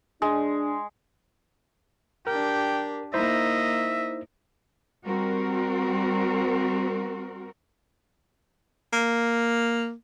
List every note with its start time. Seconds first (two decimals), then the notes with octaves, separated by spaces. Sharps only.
0.22 G#3 D4
2.27 D4 G4 A#4 G5
3.14 A#3 D#4 E4 C5 D#5 E5
5.04 G3 C4 F#4 A#4
8.93 A#3